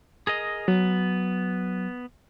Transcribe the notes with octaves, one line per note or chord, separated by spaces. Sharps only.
G#4 A#4 D#5
F#3 B3